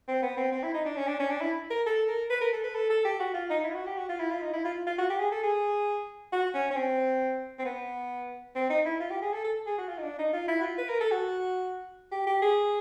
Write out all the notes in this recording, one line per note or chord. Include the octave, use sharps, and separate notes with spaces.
C4
B3
C4
C4
E4
D#4
D4
C#4
D4
C#4
D4
E4
A#4
A4
A#4
B4
A#4
A4
B4
A4
A4
G4
F#4
F4
D#4
E4
F4
F#4
G4
F#4
F4
E4
F4
D#4
E4
F4
F4
F#4
G4
G#4
A4
G#4
F#4
C#4
C#4
C4
C4
B3
C4
D#4
E4
F4
G4
G#4
A4
A4
G#4
F#4
F4
D#4
D4
D#4
F4
E4
F#4
F4
B4
A#4
A4
F#4
G4
G4
G#4